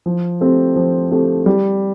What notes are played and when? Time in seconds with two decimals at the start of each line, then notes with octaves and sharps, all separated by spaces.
0.06 F3
0.41 A3 C4 G4
0.76 F3
1.11 A3 C4 G4
1.46 G3